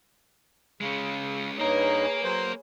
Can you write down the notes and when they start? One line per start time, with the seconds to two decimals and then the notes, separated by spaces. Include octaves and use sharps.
0.81 C#3 G#3 C#4
1.59 G2 A#3 D#4 G#4 A#4 B4 C#5
2.24 F#3 C5